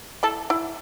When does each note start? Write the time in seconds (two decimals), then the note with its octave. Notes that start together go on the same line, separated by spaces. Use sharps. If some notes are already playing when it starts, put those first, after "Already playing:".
0.23 E4 A4 A5
0.50 E4